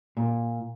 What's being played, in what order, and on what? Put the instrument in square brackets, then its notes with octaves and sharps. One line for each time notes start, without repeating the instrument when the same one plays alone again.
[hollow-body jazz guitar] A#2